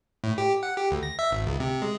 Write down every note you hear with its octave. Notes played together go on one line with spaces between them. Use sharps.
A2
G4
F#5
G4
D2
A#6
E5
G#1
C#2
C3
G#3